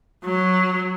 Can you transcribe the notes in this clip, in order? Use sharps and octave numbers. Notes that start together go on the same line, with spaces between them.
F#3